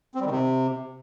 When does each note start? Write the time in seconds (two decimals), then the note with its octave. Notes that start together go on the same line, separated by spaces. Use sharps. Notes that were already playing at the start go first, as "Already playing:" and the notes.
0.15 C4
0.20 G3
0.25 D#3
0.31 C3